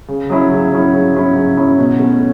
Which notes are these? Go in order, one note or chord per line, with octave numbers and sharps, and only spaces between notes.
C#3
F#3 C#4 E4
C#3
F#3 C#4 E4
C#3
F#3 C#4 E4
C#3
F#3 C#4 E4
B2
A3 C#4